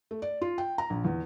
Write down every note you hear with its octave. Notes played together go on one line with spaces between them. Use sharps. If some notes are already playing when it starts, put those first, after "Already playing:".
A3
D5
F4
G5
A#5
A#1
E2